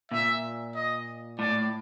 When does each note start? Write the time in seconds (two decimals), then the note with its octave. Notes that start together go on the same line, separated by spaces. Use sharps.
0.11 A#2 E5
0.75 D#5
1.39 A2 D5